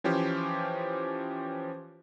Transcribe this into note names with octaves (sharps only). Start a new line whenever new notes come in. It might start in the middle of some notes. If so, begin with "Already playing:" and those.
E3 F3 C#4 G4 C5